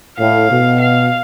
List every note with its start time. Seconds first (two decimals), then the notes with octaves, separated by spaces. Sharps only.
0.18 A2 F5
0.50 B2
0.81 F5